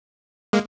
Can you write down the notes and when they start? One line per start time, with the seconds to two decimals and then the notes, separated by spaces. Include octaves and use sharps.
0.53 G#3 A#3